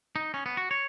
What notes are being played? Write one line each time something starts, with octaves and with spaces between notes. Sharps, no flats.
D#4
C#4
B3
F#4
C#5